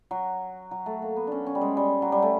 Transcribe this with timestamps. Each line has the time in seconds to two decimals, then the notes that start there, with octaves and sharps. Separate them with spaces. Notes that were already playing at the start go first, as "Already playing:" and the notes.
0.11 F#3
0.71 F#3
0.86 A3
1.02 A#3
1.16 B3
1.27 C#4 D4
1.47 C#4
1.55 G3
1.61 G#3
1.77 G3
2.02 F#3
2.12 G3
2.22 A3